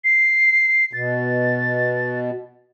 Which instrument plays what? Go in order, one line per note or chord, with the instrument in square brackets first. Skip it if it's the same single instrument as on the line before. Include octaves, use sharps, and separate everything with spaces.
[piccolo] C7
[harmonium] B2 [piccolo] A6